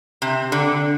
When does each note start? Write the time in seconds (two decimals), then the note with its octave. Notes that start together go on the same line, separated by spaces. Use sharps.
0.22 C3
0.52 D3